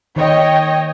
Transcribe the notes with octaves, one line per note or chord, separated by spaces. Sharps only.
D#3 C#5 D#5 G5